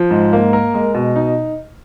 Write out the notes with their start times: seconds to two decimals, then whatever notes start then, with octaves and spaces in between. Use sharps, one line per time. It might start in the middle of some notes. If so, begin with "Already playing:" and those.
Already playing: F3
0.11 G#2
0.33 A#3
0.53 A#4
0.74 G#3
0.94 B2
1.16 D#4